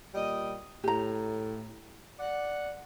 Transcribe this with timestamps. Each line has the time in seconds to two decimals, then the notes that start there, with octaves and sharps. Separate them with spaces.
0.15 A#2 G3 D#5
0.84 A2 G4 A#5
2.19 D5 F#5